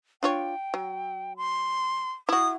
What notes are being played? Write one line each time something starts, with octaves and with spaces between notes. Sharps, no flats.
D4 F4 C#5 G5
F#3
C6
E4 F#4 D#6